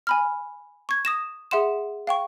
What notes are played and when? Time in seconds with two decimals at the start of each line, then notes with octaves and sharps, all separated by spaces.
0.07 G#5 B5 F6
0.89 C#6 G#6
1.05 D#6 A#6 E7
1.51 G#4 E5 F#5 C6 E7
2.07 F5 G5 C#6